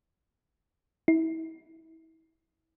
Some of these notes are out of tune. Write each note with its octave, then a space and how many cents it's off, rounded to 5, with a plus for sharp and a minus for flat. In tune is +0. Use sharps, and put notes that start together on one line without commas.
E4 -30